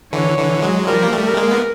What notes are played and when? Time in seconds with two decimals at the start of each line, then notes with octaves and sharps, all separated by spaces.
0.13 D3 E3 C#5
0.38 D3 E3
0.62 F#3 G#3
0.87 F3 G3 A#4
1.03 A#3
1.12 G3 A3
1.25 A#4
1.37 G#3 A#3
1.51 B3